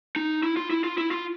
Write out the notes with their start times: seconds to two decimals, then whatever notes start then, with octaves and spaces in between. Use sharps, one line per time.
0.16 D#4
0.43 E4
0.57 F4
0.70 E4
0.84 F4
0.98 E4
1.11 F4